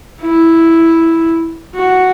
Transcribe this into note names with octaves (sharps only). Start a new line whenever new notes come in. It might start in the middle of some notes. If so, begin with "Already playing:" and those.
E4
F#4